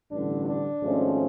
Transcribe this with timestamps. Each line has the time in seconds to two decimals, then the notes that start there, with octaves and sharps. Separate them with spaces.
0.11 A1 G2 D3 D4
0.46 D4
0.81 G#1 G#2 F3 A3 C#4